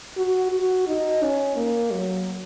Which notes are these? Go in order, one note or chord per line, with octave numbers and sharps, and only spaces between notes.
F#4
F#4
D#4
C#4
A#3
F#3